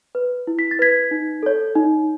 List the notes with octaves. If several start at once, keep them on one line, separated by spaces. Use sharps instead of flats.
B4
E4
B6
A6
B4 G#6 B6
D#4
A4 C#5
D#4